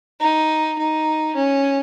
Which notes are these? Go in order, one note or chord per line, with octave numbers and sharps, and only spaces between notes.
D#4
D#4
C#4